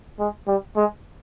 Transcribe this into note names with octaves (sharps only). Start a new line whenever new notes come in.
G#3
G3
G#3